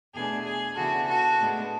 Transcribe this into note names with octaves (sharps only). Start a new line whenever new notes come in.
E2 B2 A3 D4 G#4
G#4
C#3 E3 B3 D4 F#4 A4
F#4 A4
A2 G#3 B3 D4